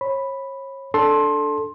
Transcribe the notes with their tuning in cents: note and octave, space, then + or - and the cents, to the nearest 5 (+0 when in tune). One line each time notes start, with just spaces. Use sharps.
C#5 -35 B5 +0
D4 +0 A4 +0 C6 +20